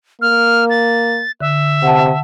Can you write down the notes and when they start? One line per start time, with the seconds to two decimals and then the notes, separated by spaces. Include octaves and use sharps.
0.22 A#3 F6
0.70 A6
1.41 D3 E5
1.83 C3 F#5 A5